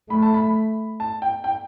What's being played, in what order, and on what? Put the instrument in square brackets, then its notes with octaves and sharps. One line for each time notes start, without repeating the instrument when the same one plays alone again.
[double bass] A3 [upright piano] B5
[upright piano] A5
B5
A5
G5
G5